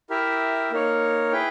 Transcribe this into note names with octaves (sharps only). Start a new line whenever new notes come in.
E4 G4 A#4 E5
A#3 D#4 A#4 C#5
E4 G#4 B4 G5